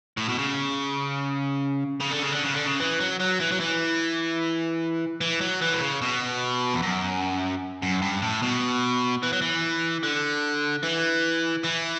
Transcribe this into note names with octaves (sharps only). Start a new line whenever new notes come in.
A2
B2
C#3
C#3
D3
C#3
D3
C#3
D3
C#3
E3
F#3
F#3
E3
F#3
E3
E3
F#3
E3
B2
C#3
B2
E2
F#2
F#2
G2
A2
B2
E3
F#3
E3
D3
E3
E3